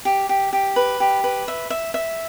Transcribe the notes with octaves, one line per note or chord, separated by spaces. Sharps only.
G4
G4
G4
B4
G4
B4
E5
E5
E5